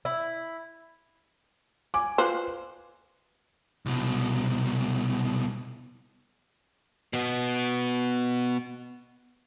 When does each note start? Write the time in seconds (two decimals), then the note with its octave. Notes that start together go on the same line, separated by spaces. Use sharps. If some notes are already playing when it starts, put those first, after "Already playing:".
0.05 E4
1.94 G#5 D6
2.18 F4 B4 C5
3.86 C2 B2
7.13 B2 B3